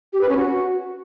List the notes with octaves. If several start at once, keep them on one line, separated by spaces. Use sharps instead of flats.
G4
B4
C#4
F#4